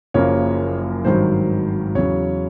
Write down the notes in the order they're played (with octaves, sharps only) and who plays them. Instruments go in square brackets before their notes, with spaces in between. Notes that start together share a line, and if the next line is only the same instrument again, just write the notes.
[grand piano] F#1 F#2 C#3 F3 A#3 C#5
G#1 G2 D#3 F#3 C5
E2 C#3 F#3 C#5